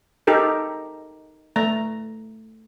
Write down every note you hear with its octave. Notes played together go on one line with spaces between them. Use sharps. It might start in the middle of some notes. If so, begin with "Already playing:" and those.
D#4 G4 A4 A#4
A3 A#5